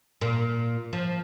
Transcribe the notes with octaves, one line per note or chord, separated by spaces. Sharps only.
A#2
F3